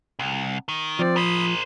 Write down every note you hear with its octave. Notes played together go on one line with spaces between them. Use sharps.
C2
D#3
F3 C4 D5
A#4 C5 B5 D#6